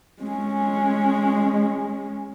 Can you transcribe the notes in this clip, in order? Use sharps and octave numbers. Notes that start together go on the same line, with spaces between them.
G#3 C#4